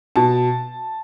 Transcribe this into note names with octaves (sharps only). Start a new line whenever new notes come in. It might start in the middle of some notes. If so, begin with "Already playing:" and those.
B2 A5